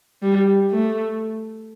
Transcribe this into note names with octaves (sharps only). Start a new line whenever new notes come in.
G3
A3